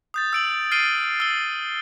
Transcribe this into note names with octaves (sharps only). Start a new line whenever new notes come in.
D#6 G6 A6
E6 D7 F#7
F6 A6 C7 D7 D#7 G7
E6 G7